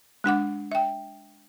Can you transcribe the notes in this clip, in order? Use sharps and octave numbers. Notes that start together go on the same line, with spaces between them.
G#3 D4 F#5 D6
E5 G5